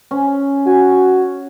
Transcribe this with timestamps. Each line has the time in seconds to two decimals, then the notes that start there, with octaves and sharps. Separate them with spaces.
0.11 C#4
0.67 F#4 G#5